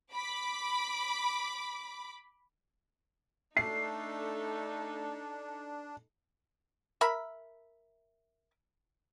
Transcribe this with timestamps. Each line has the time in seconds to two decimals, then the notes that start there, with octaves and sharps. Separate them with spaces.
0.13 B5 D6
3.57 A3 D4 D#4 A4 C7
7.01 A#4 E5 B5